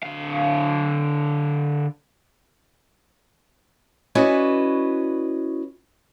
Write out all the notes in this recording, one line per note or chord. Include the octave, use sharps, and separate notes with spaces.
D3 F5
C#4 E4 F#4 B4 D5 D#5